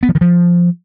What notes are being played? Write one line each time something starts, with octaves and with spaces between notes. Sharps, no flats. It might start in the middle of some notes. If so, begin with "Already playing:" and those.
B3
F3
D#3
F3